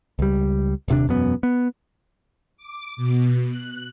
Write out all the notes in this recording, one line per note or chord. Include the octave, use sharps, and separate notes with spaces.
C#2 G3
D#1 C3 D4
E1 F#2 B3
B3
D6
B2
F#6